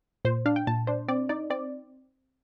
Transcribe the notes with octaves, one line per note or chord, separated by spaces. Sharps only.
A#2 C5
D4 F5
G5
A#2 A5
D4 C5
C4 D5
D#4 D5
C4 D5